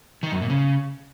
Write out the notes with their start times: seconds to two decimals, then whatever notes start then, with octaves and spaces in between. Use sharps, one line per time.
0.23 D#3
0.32 F#2
0.41 A#2
0.50 C#3